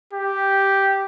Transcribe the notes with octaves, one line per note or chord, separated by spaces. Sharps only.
G4